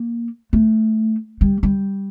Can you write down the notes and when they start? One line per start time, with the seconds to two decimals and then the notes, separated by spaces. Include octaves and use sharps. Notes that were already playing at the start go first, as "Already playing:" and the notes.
Already playing: A#3
0.53 A3
1.41 G3
1.63 G3